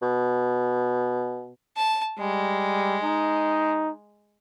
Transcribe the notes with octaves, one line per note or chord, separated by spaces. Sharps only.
B2
A5
G3 G#3
D#4